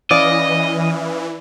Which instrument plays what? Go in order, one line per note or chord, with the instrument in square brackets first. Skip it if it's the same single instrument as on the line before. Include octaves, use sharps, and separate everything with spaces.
[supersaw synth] E3 [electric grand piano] C#4 F5 D#6 [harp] D5 [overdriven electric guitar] D#5